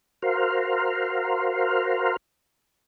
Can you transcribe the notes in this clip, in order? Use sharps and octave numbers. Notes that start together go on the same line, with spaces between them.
F#4 A#4 C5 F5